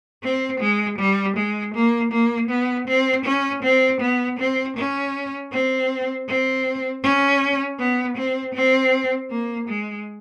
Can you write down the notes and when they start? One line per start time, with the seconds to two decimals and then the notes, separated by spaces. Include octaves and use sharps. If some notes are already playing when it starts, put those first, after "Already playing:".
0.23 C4
0.60 G#3
0.98 G3
1.36 G#3
1.74 A#3
2.12 A#3
2.50 B3
2.88 C4
3.25 C#4
3.63 C4
4.01 B3
4.39 C4
4.77 C#4
5.52 C4
6.28 C4
7.03 C#4
7.79 B3
8.17 C4
8.54 C4
9.31 A#3
9.68 G#3